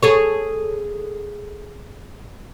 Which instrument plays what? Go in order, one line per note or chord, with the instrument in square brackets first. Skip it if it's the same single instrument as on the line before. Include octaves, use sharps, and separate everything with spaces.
[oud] G#4 A4 C#5